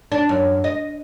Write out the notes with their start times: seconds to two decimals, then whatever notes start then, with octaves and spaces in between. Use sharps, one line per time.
0.12 D4
0.29 F#2
0.64 D#5